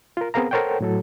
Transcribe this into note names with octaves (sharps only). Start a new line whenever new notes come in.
F4 A#4
B3 C4 G#4 A#4 F5 A#5
A4 A#4 C5 C#5 F#5 G5
A2 F#3 A4